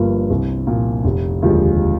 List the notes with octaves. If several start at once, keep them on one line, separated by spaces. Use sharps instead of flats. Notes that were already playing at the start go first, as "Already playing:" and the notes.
Already playing: G1 G2 F3 A#3
C2
A#2 F3
F1
D#2 D3 F3 G#3